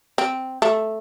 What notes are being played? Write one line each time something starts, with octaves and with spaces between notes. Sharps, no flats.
C4
A3